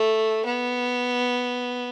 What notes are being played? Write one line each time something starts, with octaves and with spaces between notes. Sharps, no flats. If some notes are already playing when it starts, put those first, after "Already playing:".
Already playing: A3
B3